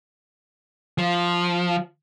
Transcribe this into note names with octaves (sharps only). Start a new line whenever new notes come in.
F3